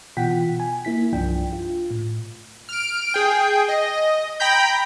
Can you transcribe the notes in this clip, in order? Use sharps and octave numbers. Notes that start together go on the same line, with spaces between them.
B2 E3 F4 F#5 G5 B6
G#5
A#3 E4 B6
C2 G2 F3 D4 G5
F4
A2
F6 D7
G#4 G5
D#5
G5 A#5 B5 G6